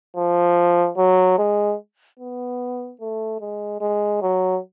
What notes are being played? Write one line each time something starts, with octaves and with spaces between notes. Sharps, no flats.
F3
F#3
G#3
B3
A3
G#3
G#3
F#3